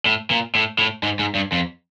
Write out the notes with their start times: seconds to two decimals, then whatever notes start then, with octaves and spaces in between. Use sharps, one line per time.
0.06 A2
0.30 A#2
0.55 A2
0.79 A2
1.03 G#2
1.19 G#2
1.35 G2
1.52 F2